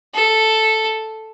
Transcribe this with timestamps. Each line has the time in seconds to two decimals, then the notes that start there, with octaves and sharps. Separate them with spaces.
0.14 A4